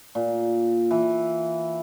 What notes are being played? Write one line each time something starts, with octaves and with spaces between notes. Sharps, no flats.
A#2
E3